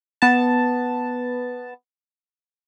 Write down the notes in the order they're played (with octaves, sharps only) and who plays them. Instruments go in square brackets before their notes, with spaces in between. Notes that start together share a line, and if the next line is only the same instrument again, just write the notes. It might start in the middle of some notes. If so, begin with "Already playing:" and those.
[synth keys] B3 A5